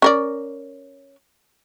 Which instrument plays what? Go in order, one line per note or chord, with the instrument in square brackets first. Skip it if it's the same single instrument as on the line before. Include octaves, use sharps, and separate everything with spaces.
[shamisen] C#4 A#4 D5